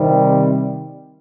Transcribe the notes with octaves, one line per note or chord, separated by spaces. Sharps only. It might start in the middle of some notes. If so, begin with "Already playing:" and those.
Already playing: C3 D#3 G3 C4